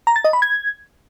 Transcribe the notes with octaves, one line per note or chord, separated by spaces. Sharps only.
A#5
A6
D#5
B5
G#6